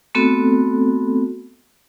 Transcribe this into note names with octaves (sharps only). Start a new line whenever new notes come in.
A3 B3 C4 F#4 A4